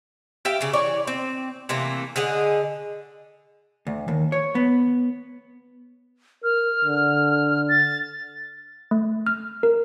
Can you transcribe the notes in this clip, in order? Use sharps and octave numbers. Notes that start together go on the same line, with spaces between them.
G4 E5 F5 G5
C#3 D5
E3 C#5 D5
C4
C3 E3 A3 A#3
D3 G#4 D#5 F#5
D2
D#2
C#5
B3
A#4 F6
D3
A6
A3
F6
A#4